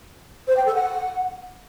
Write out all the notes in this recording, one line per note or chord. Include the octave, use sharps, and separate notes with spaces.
C5
G5
A4
F#5